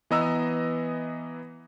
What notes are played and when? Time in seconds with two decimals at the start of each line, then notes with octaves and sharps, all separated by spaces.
0.11 E3 B3 D#5 A#5 E6